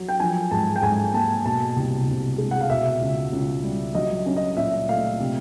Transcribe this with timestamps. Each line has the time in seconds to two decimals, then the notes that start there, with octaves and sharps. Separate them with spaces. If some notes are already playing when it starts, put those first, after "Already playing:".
Already playing: F#3
0.08 G5
0.20 F3 G#5
0.51 G#2 A5
0.76 G5
0.82 G#2 G#5
1.13 A#3 A5
1.45 B2 A5
1.76 C2
2.07 C2
2.38 G#3
2.51 F#5
2.61 F5
2.70 B2 E5
3.01 C#2
3.32 C#2
3.64 G3
3.95 F#3 D#5
4.26 C#4
4.36 D#5
4.57 A#2 E5
4.89 A3 F5
5.20 C3